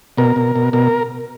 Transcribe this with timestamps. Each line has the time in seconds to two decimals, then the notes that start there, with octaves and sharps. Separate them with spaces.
0.18 B2 A#4
0.36 B2
0.56 B2
0.73 B2 A#4